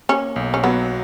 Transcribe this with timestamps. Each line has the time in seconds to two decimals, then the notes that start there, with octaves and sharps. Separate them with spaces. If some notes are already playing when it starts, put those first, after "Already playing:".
0.09 A#3 C#4
0.36 B1
0.54 C#4
0.64 F#3 B3